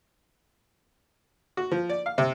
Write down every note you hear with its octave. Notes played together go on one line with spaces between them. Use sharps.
F#4
F3
D5
F5
C3